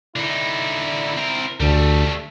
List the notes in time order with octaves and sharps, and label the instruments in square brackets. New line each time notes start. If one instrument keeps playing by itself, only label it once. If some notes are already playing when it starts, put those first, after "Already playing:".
[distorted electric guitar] D3 D#4 [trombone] E4
[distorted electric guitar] C4 A#4
[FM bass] D2 [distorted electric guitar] G3 A3 [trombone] A4